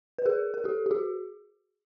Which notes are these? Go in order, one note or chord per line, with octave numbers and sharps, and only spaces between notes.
B4
G#4 A#4
A#4
G4 A4
G4
F#4 G#4